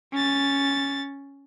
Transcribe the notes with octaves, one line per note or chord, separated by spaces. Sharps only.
C#4 A6